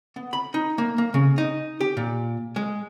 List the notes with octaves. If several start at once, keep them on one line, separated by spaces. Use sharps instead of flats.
B3
B5
D#4
A#3
A#3
C#3
D#4
G4
A#2
G#3